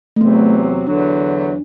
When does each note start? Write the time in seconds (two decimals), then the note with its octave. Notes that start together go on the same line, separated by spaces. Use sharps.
0.16 A3
0.21 E2 C3 F#3 B3
0.87 E2 D3 F#3 D4